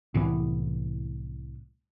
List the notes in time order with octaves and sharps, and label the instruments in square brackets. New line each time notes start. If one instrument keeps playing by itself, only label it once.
[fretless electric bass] C2 A2 E3 B3